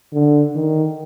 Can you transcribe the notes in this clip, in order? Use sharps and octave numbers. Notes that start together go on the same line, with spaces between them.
D3
D#3